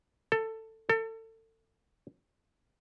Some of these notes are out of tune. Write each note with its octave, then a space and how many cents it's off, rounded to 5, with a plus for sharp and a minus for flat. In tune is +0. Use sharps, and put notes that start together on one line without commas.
A4 +15
A4 +30